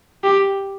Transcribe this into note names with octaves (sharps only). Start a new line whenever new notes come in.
G4